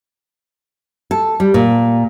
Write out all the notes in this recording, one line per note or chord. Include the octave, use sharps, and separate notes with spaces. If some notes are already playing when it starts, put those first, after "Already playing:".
A4
G3
A#2